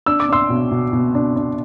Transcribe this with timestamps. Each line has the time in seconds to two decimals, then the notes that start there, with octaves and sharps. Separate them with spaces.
0.06 D4 E6
0.20 D6
0.29 D4 C6 E6
0.50 B2
0.72 B2
0.93 B2
1.15 D4
1.36 D4